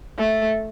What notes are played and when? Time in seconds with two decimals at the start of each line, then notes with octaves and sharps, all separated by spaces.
0.18 A3